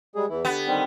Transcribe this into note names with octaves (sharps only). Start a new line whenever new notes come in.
G3 G#3 G#4
E2 E3 E4
D3 B3 G4
D#3 G3 C4